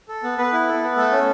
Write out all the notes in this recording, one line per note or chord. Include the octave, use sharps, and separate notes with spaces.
A4
B3
B3 B4
E4
A4
B3
A3 A4
C#4